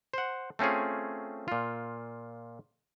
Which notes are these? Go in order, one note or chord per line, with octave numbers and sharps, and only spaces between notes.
C5 F#5
A3 C4 C#4 F4 G#4
A#2 F4